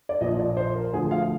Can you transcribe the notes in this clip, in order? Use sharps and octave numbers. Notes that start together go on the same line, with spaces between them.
D5
A#1 A#2 F3 D#5
D5
C5
A#4
D2 D3 F3 G#4
F5